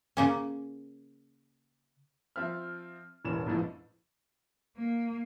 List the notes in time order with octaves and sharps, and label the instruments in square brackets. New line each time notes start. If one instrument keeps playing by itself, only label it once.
[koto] C#3 A#3 C#4
[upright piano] F3 C4 E5 F6
E1 A1 E3 G3 C#4 E7
A#1 F2 A2 E3 F3 G#3
[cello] A#3